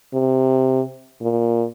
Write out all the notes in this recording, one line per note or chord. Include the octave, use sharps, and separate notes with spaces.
C3
A#2